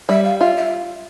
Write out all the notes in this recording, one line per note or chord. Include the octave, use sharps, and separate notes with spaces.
G3 E5
F5
F4 E5
E5